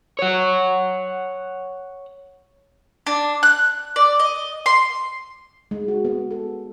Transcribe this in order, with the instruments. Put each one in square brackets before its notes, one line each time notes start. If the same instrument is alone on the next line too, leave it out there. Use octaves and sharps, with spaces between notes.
[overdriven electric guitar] C#5 F#5
[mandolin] D4
F#6
D5
D#5
C6
[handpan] G#3
F#4
B3
A4